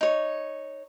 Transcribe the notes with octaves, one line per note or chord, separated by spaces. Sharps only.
D#4 C#5